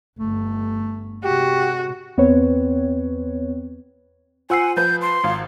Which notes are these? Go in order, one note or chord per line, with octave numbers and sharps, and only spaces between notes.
G1 A3
C3 G#3 F#4 G4
E2 B3 C4 B4 C#5
F4 C5 F#5 G#5 E6 C7
F3 B4 G6
C6
G#1 F4